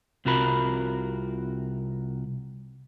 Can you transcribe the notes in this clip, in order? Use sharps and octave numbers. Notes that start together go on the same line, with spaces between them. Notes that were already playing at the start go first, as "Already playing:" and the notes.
C2 C3 F4 F#4 A#4 B5